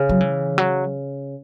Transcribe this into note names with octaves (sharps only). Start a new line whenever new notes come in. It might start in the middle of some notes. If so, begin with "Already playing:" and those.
Already playing: C#3
F#3
E3
F#3